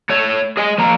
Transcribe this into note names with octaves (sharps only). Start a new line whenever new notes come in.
A3 C#5
G#4 D#5 G#5
F3 A#3 A#5